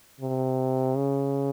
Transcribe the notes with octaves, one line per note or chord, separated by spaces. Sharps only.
C3
C#3